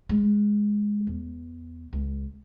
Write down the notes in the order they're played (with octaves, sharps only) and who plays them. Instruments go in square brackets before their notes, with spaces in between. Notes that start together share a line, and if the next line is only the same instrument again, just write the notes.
[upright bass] G#3
E2
C#2